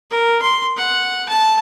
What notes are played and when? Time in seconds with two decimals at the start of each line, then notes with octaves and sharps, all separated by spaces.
0.11 A#4
0.42 C6
0.77 F#5
1.29 A5